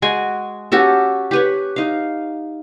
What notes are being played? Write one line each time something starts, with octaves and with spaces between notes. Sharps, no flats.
G#3 F#4 G#5
C#4 F#4 G4 A4
G4 B4 C#5
D#4 F5